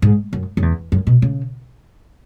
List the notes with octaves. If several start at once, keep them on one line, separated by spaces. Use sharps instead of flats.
G#2
F#2
F#2
E2
F#2
B2
C#3